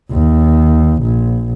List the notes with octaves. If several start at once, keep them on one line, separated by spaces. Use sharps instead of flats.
D#2
A#1